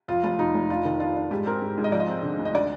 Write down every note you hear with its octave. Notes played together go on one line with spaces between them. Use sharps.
F2 F4
F1 F4
F2 D#4
F1
D4 F4
D#3
D4 F4
D4
G#2 G4
C4 A#4
G#2
G#2
D#5
F3 D5
D#5
C4
D3
D2
D#5
D3 D5